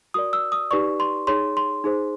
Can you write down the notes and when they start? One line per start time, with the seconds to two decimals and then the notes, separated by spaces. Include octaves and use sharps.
0.14 F#4 A#4 D5 D#6
0.33 E6
0.52 D#6
0.71 D#4 G4 B4 D5 C#6
1.00 C6
1.27 D#4 G#4 C#5 C6
1.57 C6
1.84 D#4 G#4 C5